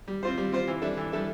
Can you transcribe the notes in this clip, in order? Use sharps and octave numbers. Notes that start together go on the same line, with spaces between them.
G3
C4 F4 C5
G3
C4 F4 C5
E3
G3 D4 A4 E5
E3
G3 D4 A4 E5